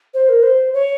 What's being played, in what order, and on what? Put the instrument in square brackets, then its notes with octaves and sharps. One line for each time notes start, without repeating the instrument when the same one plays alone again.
[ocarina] C5
A#4
C5
C#5